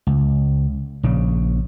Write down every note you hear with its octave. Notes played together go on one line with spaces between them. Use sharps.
C#2
A#1 C#3